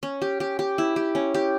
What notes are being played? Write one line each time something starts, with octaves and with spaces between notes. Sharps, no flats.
C#4
G4
G4
G4
E4
G4
C#4
G4